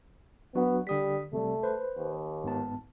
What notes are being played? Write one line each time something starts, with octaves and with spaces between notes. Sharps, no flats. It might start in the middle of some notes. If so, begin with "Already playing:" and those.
F#3 B3 D4 F#4
D3 G3 D#6 B6
C3 G3 A3
B4 C5
D#2
G#2 B3 A5